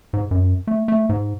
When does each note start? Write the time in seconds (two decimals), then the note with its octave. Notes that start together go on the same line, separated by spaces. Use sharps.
0.13 G#2
0.31 F#2
0.67 A3
0.88 A3
1.09 G#2